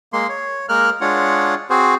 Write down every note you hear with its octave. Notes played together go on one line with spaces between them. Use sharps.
G#3 A#3 C6
C#5
G#3 A#3 A#4 F6 F#6
G#3 D4 F4 C#5 F#5
C4 F#4 G#4 C5